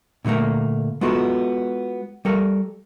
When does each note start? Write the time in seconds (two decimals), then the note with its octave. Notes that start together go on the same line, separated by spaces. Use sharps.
0.25 A#2 D3 F#3 A3 A#3
1.01 G#3 B3 F4 F#4 A4
2.25 G3 A4 A#4